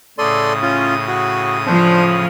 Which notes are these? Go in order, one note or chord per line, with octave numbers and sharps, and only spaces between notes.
A2 C#3 A4 D5 C6 D#6
C#4 F4
F#4
F3 D4 C5